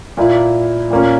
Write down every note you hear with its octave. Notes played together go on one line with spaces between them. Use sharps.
A#2 A#3 E4
A#2 A#3 C#4